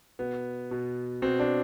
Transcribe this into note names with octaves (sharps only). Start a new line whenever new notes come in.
B2 B3
B2
B2 C4
D4